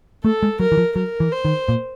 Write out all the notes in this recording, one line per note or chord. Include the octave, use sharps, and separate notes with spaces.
A3 A4
G#3
F#3 A#4
E3
F3
F#3 A#4
E3
C5
D#3
A#2